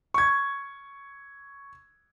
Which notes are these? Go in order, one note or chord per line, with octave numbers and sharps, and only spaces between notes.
C#6 G#6